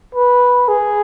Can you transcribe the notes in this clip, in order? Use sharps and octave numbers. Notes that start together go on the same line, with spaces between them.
B4
G#4